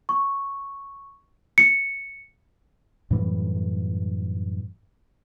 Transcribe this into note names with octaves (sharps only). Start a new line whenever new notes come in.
C#6
C#7
F#2 A2 E3 G3